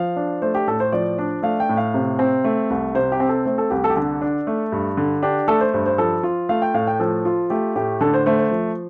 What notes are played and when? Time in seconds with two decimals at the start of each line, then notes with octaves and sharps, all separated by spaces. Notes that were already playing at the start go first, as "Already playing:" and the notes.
Already playing: F3 F5
0.16 D4
0.42 A3 C5
0.55 G4
0.67 A2 A4
0.80 C5
0.92 F3 D5
1.18 D4
1.43 A3 F5
1.60 G5
1.69 A2
1.77 F5
1.94 C3
2.19 C4
2.44 A3
2.70 C2
2.95 C3 C5
3.12 G4
3.20 C4
3.29 A4
3.45 A3 C5
3.58 A4
3.70 C2 G4
3.84 A4
3.90 G4
3.96 D3 A4
4.21 D4
4.47 A3
4.72 G2
4.97 D3
5.22 D4 G4
5.48 A3 A4
5.61 C5
5.74 G2 C5
5.86 C5
5.98 F3 A4
6.23 F4
6.49 A3 F5
6.62 G5
6.74 A2 F5
6.87 G5
7.00 F3 A4
7.25 F4
7.50 A3 G4
7.76 A2 G4
8.01 D3 A4
8.14 C5
8.26 A3 C5
8.39 C5
8.51 F3